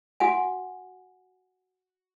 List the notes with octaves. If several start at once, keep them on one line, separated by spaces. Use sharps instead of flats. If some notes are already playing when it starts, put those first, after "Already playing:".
F#4 F#5 G#5